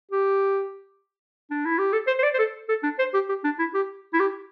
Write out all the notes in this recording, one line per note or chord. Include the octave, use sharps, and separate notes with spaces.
G4
D4
E4
G4
A4
C5
C5
D5
C5
A4
A4
D4
C5
G4
G4
D4
E4
G4
E4
G4